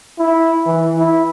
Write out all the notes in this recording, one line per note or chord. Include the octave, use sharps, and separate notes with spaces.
E4
E3
E4